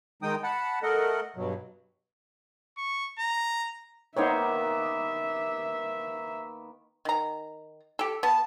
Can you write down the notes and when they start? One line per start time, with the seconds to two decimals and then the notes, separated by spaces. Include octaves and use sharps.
0.22 D#3 G#3 D#4 G5 D#6
0.43 F#5 A5 B5
0.83 A3 A4 A#4 D#5 F#5
1.36 G2 B2 F#3
2.77 C#6
3.19 A#5
4.16 D#3 A#3 B3 D#4 C5 C#5 E5
7.05 D#3 A#5
7.99 G4 A4
8.23 B3 A5